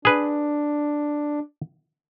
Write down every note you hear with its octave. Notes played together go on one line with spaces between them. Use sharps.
D4 G#4 B4